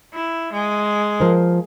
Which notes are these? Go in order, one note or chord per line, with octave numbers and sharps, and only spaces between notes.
E4
G#3
F3 A#4 C5